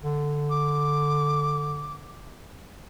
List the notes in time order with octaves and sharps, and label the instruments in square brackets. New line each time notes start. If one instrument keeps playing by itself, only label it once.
[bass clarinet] D3
[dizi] D6